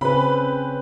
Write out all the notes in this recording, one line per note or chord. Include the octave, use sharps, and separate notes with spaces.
C#3 C4 C#4 B4 B5